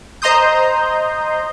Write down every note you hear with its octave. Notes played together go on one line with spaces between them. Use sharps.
C5 D#5 A#5 C6 D#6 G6